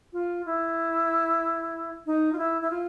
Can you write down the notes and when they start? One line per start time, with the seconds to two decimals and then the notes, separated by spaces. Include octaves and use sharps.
0.13 F4
0.46 E4
2.06 D#4
2.33 F4
2.38 E4
2.61 E4
2.70 F4